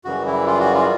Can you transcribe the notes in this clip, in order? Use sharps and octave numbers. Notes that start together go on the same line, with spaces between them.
F#2 C#3 E3 G3 F#4
E4
F4
F#4
F4